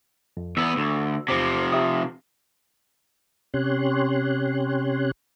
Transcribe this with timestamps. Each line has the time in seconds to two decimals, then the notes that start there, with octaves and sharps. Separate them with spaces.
0.37 F2
0.57 E2 B3 E6
0.77 D2
1.28 E2 C3 F3 C5 D6
1.72 G4 E5 D#6
3.54 C3 C#4 G4 C#5 C6 F#6